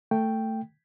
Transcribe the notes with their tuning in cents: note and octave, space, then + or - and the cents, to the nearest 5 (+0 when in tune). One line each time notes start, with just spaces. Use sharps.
A3 +15 G5 +0